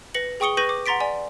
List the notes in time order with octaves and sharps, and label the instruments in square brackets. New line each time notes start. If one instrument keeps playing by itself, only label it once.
[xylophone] B4 A#6 C#7 F#7
G#4 G5 C#6 D#6 C#7 G7
B4 C#6 G6 A#6 D#7 F#7
D6
F#5 A#5 C6 A6 B6 D7
D5 G#5